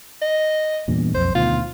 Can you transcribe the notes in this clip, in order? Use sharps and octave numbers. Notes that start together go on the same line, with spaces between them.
D#5
E2 G2 A#2
B1 F2 C5
D2 B2 D#3 F4